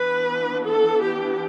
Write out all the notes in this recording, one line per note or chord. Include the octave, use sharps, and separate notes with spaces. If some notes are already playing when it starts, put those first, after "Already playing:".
Already playing: E3 B3 D4 B4
A4
G4